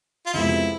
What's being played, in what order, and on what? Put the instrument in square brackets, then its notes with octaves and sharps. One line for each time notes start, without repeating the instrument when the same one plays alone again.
[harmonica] F4
[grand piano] F2 C3 F3 G#3 B3 [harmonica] E4